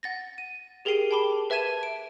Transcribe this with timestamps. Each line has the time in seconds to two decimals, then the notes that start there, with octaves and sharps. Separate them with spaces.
0.03 F#5 A6 A#6
0.38 D#7
0.85 G4 G#4 A#4 G5 C7 D#7
1.11 G5 A5 B5 D6 G7
1.50 B4 E5 A5 G#6 D#7 E7
1.83 D7